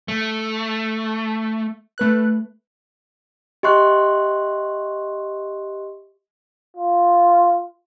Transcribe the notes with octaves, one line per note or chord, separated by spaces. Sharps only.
A3
A3 B4 F#6
G4 D#5 E5 C6 C#6 F#6
F4